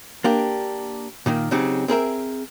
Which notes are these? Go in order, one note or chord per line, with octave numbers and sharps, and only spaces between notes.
A#3 D4 G4
A#2 D#3 A#3
C#3 F#3 C4 D#4 G4 G#4
C4 G#4 A#4 E5